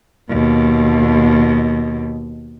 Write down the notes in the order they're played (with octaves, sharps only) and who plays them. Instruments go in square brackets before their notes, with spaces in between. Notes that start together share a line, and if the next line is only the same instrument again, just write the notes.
[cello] D#2 B2